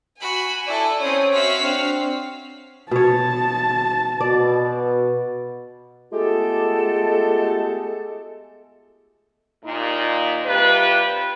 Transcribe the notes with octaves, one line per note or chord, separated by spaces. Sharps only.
F#4 G#5 B5
E4 A4 D5
C4 C#4 C#5 D#6
F#4 E5 F5 B6
C4 D4
B2 C#5 A5
B2 D5
G#3 A3 B3 F4 G4 A4
D#2 A#2 D#4
C3 G3 F4 G4 B4